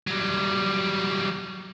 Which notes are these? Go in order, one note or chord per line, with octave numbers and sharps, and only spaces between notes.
F#3 G3